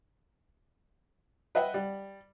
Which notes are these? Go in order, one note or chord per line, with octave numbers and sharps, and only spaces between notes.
B4 D#5 E5 F#5 G5
G3